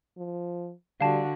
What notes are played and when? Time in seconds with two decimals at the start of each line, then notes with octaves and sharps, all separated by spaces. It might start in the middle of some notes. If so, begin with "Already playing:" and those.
0.17 F3
1.01 D3 G3 F#4 F5 A5